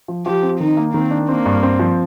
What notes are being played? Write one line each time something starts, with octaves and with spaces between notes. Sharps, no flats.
F3
F3 G4
C4
D#3 D#4
A#3
D#3 C4
D4
A#3 C4
G2
C4
F3